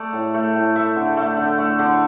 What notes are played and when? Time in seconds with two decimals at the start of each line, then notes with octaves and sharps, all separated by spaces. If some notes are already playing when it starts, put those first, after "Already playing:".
Already playing: A3 D5
0.13 A2
0.34 A3
0.55 A2
0.76 A3 E5
0.96 D3
1.17 A3
1.37 D3
1.58 A3
1.79 D3